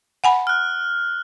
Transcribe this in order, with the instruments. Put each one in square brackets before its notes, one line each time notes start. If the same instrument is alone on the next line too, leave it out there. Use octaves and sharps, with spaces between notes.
[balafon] F#5 G#5 B5
[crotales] F6 F#6